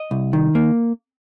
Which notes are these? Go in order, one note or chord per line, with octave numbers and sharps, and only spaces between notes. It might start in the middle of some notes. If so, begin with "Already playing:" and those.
Already playing: D#5
C2
D#3
A#3